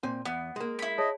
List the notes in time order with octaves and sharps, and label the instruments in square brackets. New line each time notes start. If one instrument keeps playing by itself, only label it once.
[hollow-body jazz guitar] A#2 C4 G#5
[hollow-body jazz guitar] E2 [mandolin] B3
[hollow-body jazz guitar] G#3 A#3
[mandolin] E4 B5
[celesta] G#4 C#5 A5 [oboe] D#5